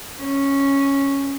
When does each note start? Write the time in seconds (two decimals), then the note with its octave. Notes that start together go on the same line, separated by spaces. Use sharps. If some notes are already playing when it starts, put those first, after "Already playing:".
0.20 C#4